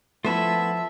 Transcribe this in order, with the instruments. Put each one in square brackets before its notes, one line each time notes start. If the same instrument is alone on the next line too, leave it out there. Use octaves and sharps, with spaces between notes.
[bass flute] F3 [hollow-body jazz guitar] A3 B3 E4 [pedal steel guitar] F4 A5 E6 [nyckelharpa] E5